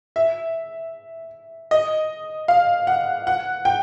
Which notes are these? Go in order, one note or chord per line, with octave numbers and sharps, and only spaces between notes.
E5
D#5
F5
F#5
F#5
G5